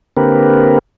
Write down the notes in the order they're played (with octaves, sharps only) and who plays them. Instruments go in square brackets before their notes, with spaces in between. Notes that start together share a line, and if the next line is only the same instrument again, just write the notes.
[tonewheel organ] D3 A#3 C4 G4 A#4 B4